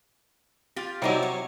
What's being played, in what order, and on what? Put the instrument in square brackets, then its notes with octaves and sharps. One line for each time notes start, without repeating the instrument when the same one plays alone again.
[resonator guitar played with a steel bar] F4 G4
[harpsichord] C3 F#3 [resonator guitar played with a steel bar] G3 D#4 E4
[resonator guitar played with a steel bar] C#5